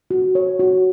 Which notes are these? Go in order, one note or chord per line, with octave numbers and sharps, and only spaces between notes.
F#4
C#5
F#4